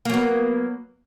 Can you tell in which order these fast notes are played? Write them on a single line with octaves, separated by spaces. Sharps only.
A#3 F#3 B3